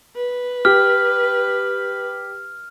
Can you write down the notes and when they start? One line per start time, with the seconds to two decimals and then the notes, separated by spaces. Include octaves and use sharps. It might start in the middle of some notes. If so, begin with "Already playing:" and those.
0.16 B4
0.65 G4 F6